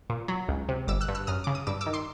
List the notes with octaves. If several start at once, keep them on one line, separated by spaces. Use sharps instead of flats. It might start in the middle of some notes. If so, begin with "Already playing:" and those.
A#2
F#3
C#2
C3
G1 D6 E6
E6 F#6
G2
E6 F#6
F#2 D#6 F6
C#3 D6
D#6
G2 D6 E6
D6 E6
D#3
C6 D6